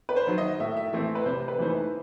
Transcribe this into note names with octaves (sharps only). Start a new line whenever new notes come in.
B4
C5
D#3 F#3
D#5
A2 E5
E5
E3 A3 C4 E4 E5
B4
C3 C5
B4
E3 A3 D#4 C5
B4